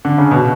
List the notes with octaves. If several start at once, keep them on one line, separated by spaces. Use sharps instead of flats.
D3
C#3
B2